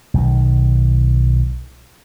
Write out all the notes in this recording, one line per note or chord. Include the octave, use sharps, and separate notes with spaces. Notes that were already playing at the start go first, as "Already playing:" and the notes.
B1 D#3